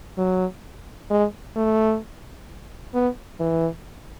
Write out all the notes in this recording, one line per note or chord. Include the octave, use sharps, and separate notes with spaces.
F#3
G#3
A3
B3
E3